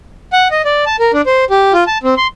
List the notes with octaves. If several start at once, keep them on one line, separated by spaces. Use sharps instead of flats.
F#5
D#5
D5
A5
A#4
D4
C5
G4
F4
A5
C4
C6